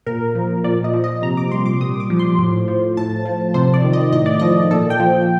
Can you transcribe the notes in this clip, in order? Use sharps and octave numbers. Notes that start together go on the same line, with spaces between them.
A#2 A#4
F3
A#2 D5
D#5
F3
D#5
C3 A#5
D6
G3 C6
D6
A#2 D#6
D6
F3
C6
A2
F3
A2 A5
F3
C3 C5
D5
D#3
D#5
A2 D#5
D5
F3 D#5
A#2 A4
G5
F3